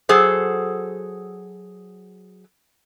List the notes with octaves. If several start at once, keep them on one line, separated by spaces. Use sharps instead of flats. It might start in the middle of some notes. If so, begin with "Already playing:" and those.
F#3 G#4 A4 C5